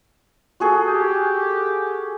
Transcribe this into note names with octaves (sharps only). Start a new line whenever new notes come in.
F#4 G#4 A4
G4